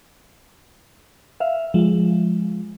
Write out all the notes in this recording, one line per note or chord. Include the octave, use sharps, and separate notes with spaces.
E5 F5
F3 G#3